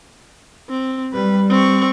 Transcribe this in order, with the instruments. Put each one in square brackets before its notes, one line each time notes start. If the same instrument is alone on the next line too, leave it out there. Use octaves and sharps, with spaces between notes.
[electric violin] C4
[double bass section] G3 [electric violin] B4
[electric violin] C4 C#6